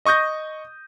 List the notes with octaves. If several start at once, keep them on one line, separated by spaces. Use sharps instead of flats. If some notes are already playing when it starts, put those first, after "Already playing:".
D#5 C#6 D#6 G6 A#6